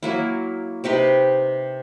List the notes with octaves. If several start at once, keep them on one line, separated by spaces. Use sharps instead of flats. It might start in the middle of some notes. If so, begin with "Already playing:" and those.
F#3 A#3 E4
C3 D#4 G4 B4